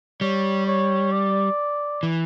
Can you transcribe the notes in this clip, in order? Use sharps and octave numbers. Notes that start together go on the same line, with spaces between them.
G3 C#5
C#5
D5
E3